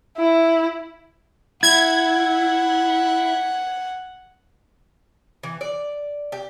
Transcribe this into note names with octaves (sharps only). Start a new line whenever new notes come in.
E4
E4 F#5 G#6
E3
D5
G4